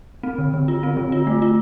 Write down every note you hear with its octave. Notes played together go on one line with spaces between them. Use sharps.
C4
D3
D3
F4
C4
D3
F4
A3
F4